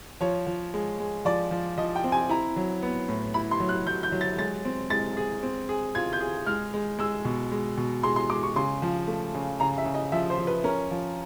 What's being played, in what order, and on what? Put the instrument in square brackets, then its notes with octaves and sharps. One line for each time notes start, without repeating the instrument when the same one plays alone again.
[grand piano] F3 [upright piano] C#5
[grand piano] F3
G#3
G#3
[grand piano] F3 [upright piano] D5
[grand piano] F3
[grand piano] F3 [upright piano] D#5
[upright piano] G5
[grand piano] C4
[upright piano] G#5
[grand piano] E4 [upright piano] A#5
[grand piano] F#3
B3
A2
[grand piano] E4 [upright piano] B5
[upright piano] C6
[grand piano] F#3
[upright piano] F#6
[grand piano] F#3 [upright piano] G6
[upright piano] G6
[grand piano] F#3
[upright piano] A6
[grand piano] G#3 [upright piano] A6
[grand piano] C4
[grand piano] G#3 [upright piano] A6
[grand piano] G#4
C4
G#4
[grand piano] F4 [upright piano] G#6
[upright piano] G6
[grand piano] G#4
[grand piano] G#3 [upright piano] F6
[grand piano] G#3
[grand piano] G#3 [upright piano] E6
[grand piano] B2
G#3
B2
[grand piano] G#3 [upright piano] C6
[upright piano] C6
[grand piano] G#3 [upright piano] D6
[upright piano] C#6
[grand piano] C#3 [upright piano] C6
[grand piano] F3
A3
C#3
[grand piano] C#3 [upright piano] A#5
[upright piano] E5
[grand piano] C#3
[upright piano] D#5
[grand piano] F3 [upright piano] E5
[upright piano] C5
[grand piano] F3
[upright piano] B4
[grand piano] C#4 [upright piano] A#4
[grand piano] F3